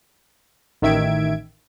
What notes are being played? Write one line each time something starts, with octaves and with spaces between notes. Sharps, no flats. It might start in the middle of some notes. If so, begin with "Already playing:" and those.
A1 D#3 E5 G#6 D7